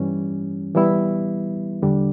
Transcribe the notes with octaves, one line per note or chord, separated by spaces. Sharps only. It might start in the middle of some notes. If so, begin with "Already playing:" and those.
Already playing: G2 E3 G3 C#4
E3 G3 B3 E4
E2 D3 G3 D4